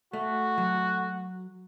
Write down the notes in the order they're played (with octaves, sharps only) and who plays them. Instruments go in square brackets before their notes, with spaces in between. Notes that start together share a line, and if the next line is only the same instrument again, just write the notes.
[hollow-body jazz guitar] A3 [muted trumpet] F#4
[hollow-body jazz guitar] F#3